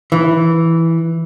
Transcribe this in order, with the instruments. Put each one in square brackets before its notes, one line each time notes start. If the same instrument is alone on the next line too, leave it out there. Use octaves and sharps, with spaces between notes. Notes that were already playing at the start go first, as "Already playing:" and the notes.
[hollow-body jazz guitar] E3